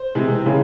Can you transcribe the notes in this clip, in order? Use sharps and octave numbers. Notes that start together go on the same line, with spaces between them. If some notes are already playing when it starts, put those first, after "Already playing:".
Already playing: C5
C3 E3 G#3
C#3 E3 G#3